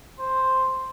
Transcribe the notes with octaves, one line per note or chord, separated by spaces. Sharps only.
C5